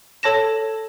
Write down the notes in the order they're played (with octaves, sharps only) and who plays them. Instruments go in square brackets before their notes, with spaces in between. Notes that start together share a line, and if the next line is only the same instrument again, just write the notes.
[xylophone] A4 C#5 A5 A#6 E7